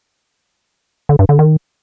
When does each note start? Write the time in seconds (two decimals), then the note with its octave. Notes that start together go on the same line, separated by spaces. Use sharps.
1.09 D3
1.19 G2
1.29 D3
1.39 D#3